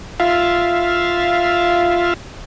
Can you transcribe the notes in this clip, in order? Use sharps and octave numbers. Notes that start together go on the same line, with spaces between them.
F4 E5 F5